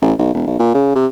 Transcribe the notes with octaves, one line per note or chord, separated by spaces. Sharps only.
A1
B1
E1
B1
A#2
C#3
C3